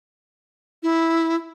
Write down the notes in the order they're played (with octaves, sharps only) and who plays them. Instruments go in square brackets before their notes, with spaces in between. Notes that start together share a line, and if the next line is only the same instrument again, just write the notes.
[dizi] E4